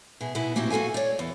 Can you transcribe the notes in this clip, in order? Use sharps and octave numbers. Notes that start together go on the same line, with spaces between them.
B2 G#4 E5
B2 B3 E4 G#5
A2 A#3 C4 F#4 G4
A#3 F#4 A4 F5 G#5
C#5 D5
E2